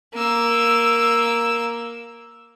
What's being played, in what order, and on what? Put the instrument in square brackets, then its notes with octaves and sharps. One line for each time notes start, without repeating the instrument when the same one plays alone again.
[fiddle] A#3 E6